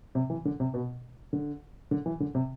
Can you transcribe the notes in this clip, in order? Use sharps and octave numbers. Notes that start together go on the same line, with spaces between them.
C3
E3
D3
C3
B2
D3
D3
E3
D3
C3